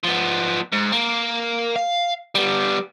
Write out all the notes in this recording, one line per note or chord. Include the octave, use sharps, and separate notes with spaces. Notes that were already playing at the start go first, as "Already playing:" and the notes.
F3 B3
G#2
A#3
F5
G3 B3